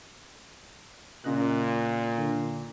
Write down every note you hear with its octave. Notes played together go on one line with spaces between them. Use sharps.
A#2 C#3 D#5 F#6
D3